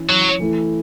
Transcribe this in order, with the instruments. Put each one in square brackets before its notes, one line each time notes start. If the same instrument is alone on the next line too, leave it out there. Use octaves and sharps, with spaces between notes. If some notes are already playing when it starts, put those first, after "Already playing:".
Already playing: [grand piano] E3 C#4 E4
[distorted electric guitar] F#3
[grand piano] E3 A3 E4 A4